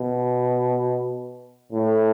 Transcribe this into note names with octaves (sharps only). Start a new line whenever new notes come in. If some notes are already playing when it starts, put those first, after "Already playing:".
Already playing: B2
A2